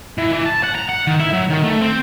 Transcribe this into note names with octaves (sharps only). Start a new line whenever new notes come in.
E3
E3
A5
F#5
A#5
F#5
D#3
E4
F#3
D#3
A3
C4